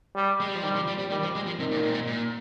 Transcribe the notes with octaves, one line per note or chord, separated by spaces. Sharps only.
G3
G#3
G3
F3
D#3 G3
F3
G3
G3
D#3 G3
F3
G#3
F3
C3 D#3
A#2
G#2
A#2
G#2
A#2
A#2